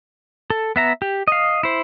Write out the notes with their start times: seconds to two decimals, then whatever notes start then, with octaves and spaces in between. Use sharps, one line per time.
0.50 A4
0.76 B3 E5 A#5
1.02 G4
1.28 D#5 F5
1.63 E4 C5